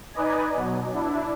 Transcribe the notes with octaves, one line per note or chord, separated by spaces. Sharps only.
D#4 B4 D5 D#5 G#5
B2 F#3
D4 E4